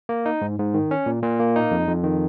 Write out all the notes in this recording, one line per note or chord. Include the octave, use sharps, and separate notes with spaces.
A#3
D#4
G#2
G#2
D#3
C#4
A#2
A#2
A#3
D#4
F2
F2
D#3